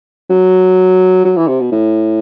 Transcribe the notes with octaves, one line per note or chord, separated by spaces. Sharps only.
F#3
F#3
E3
C3
B2
A2